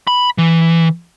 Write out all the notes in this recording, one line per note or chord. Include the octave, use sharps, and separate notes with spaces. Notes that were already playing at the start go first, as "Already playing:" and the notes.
B5
E3